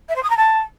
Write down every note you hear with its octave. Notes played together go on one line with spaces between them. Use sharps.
E5
C5
D#6
A#5
A5